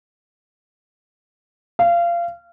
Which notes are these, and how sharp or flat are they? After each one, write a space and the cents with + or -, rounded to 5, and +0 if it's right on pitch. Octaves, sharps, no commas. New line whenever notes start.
F5 -25